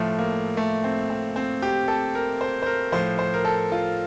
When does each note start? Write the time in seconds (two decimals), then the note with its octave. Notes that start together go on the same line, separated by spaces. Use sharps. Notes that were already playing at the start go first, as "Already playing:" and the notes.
Already playing: A2 F3 A3
0.19 A#3
0.57 A3
0.84 C4
1.10 C4
1.36 C4
1.62 G4
1.88 A4
2.15 A#4
2.41 C5
2.62 C5
2.66 A#4
2.92 A2 F3 C5
3.19 C5
3.34 A#4
3.45 A4
3.72 F4